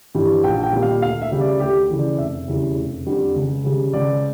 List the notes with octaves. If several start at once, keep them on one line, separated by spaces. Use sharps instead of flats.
G2 E3 G3
A#1 G5
G5
A#2 G3
F5
D2 F5
E5
C#3 G3
D5
D2 G4
C#3 E3
D5
F1 E5
E2 C#3 G3
F1
F2 D3 G3
C#2
C#3 G3
C#2 D5